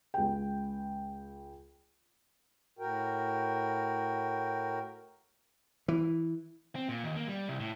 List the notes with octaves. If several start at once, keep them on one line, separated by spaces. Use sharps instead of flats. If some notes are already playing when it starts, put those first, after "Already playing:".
C#2 G5
A2 F#4 A#4 G5
E3
C4
A#2
D#2
A#3
G3
C2
A2